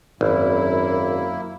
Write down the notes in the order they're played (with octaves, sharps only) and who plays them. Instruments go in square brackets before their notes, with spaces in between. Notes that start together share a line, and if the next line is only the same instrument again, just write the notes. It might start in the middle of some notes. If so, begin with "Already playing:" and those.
[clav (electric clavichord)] G#1 [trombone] F#2 [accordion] A#3 E4